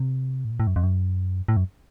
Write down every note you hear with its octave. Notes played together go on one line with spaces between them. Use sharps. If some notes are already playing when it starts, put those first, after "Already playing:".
Already playing: C3
A2
A#2
A2
F#2
F2
F#2
A2
F#2